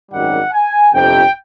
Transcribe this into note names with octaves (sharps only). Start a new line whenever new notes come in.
G#1 F#2 D#3 G3 F#5
G#5
G1 F2 C3 G5